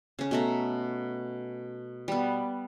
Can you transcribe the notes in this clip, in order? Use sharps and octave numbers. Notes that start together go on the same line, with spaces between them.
C#3 C#4
B2 A3 A#5
G3 B3